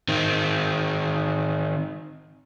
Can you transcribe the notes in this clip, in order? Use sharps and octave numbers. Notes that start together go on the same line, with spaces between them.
D#3 C4